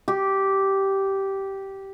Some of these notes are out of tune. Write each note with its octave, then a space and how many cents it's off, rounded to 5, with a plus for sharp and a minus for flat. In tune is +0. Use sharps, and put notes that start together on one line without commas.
G4 -10